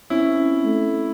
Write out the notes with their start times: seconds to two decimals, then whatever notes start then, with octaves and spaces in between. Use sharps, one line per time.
0.10 C4 C#4 E4
0.64 A3